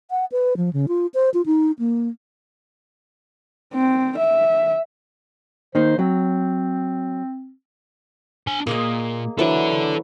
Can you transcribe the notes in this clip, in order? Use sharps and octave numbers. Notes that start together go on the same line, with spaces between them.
F#5
B4
F3
C#3
F4
C5
F4
D#4
A#3
C4
E5
D#3 A#3 D#4 C5
F#3 C4
D4 G#5
A#2 A#3 G#4 D#5
E3 F#3 A4 D5